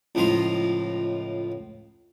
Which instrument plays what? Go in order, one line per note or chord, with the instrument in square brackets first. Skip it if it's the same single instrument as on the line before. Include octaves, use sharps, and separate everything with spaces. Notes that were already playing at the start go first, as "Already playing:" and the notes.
[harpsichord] C#2 A2 F3 D#5 A#5 C6